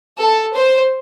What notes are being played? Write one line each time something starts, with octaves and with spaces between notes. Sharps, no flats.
A4
C5